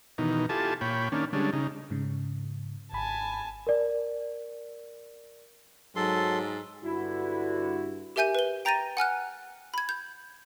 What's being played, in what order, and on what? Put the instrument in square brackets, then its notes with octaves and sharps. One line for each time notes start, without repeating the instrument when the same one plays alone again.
[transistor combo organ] B2 D#3 E3 D#4
E4 F4 G4 A4 G#5 A5
A#2 C#5 G5 B5
D#3 A#3 C#4 D4
D3 G3 G#3 C#4 D4
C#3 D#4
[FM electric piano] G#2 C#3
[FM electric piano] G#1 B5 [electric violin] G#5 A5
[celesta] A#4 D5
[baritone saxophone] G#2 [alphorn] F#3 [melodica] A4 C6
[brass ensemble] G2 D3 F#4 [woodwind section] E4
[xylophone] G4 A#4 E5 G#5 G6 D#7
B4 G7
G5 A#5 G6 A6 A#6 D#7
F#5 G#5 F6 F#6
B5 G#6
G6